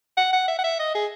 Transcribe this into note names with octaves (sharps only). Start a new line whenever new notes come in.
F#5
F#5
E5
F#5
E5
D#5
G#4